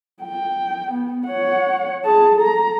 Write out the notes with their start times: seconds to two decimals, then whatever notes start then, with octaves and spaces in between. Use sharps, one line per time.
0.23 G5
0.92 B3
1.27 C#5 F#5
2.05 G#4 A5
2.37 A4 A#5